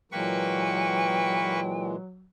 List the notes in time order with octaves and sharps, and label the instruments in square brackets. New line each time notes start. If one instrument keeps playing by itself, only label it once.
[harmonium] A#2 E3 G#3 [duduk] F#3 [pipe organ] A#3 B4 C#6 [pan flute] G5